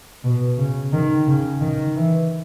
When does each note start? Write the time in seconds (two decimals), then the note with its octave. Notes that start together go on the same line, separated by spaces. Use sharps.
0.24 B2
0.57 C#3
0.93 D#3
1.27 C#3
1.61 D#3
1.95 E3